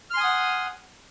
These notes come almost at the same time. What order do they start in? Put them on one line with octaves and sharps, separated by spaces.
F6 C6 G#5 D#6 F#5